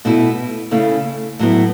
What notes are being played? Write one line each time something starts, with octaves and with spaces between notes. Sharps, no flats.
B2 A3 E4
C#3 A3 C#4 E4
A2 F#3 B3 E4